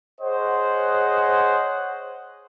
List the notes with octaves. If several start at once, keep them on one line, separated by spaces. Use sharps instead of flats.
G#4 C5 C#5 D#5 F#5